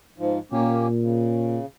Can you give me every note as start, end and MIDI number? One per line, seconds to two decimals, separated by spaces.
0.18 0.39 44
0.18 0.39 53
0.52 1.57 46
0.52 0.88 58
0.52 0.88 61
0.52 0.88 67
1.01 1.66 49